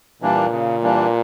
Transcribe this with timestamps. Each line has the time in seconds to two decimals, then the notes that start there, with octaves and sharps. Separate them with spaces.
0.22 A#2 E3 G3 A#3 D4
0.52 C#3
0.82 E3 G3 A#3 D4